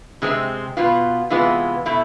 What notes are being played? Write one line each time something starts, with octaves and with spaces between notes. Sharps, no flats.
C3 G#3 C4
B2 B3 F4
C3 E3 G#3 B3 F4
B2 A3 E4